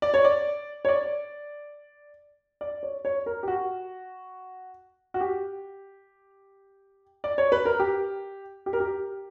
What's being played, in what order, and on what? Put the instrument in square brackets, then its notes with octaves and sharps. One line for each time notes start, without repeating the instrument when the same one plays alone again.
[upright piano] D5
C#5
D5
C#5
D5
D5
C#5
C#5
A#4
G4
F#4
F#4
G4
D5
C#5
B4
A#4
G4
G4
A#4
G4